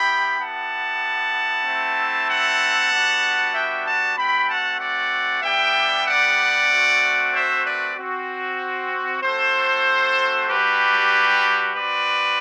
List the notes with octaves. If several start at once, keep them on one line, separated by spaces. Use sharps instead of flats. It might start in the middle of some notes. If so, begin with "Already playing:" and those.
Already playing: B3 E4 G4 G5 B5
B3 E4 G4 F#5 A5
A3 C4 E4
F#5 A5
G3 B3 D4 F#4
E5 G5
F#5 A5
A3 C4 F#4 G5 B5
F#5 A5
D5 F#5
G3 B3 D4 G4 E5 G5
D5 F#5
A3 C4 F#4
C5 E5
B4 D5
C4 F#4
A3 C4 F#4 A4 C5
G3 D4 F#4 G4 B4
C4 F#4 B4 D5